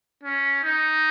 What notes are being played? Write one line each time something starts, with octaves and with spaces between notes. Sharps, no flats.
C#4
D#4